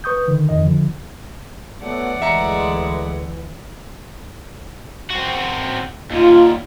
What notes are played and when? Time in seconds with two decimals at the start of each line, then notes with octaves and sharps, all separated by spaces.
0.04 B4 C#6 D#6 G6
0.28 D3 D#3
0.49 F2 D#3 D#5
0.62 D3 F3
1.82 F#3 A3 B3 D5 F#5
2.22 D2 E3 G#3 A3 E5 A#5 C#7
5.11 C4 F#4
6.11 D#2 A#2 F4